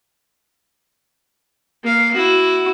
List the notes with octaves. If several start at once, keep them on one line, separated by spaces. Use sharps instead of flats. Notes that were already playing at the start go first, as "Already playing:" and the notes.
A#3 F5
E4 F#4